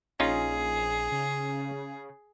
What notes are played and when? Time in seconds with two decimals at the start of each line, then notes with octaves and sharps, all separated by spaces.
0.20 A#1 C#4 D#4 F4 G#4
1.12 C#3